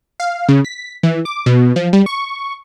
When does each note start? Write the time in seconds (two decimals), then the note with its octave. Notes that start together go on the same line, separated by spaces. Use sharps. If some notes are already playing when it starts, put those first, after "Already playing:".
0.20 F5
0.49 C#3
0.65 B6
1.03 E3
1.25 D6
1.46 B2
1.76 F3
1.93 G3
2.06 C#6